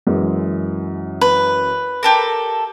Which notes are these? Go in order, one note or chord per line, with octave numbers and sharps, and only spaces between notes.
F#2 E3 G#3
B4
G4 A4 A#4